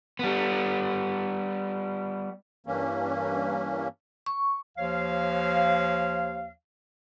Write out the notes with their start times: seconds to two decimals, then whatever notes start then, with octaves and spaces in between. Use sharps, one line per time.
0.19 G3 B3
2.66 G2 E3 A#3 C#4
4.26 C#6
4.78 D#2 F3 C#5 F5